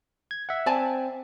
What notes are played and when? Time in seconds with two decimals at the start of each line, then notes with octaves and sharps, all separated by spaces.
0.31 G#6
0.49 E5 F#5
0.66 C4 D5 G#5 A5